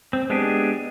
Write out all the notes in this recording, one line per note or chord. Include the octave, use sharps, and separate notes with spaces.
C4
G#3 B3 D4 G4 G#4